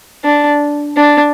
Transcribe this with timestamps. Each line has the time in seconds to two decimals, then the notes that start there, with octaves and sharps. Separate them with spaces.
0.24 D4
0.97 D4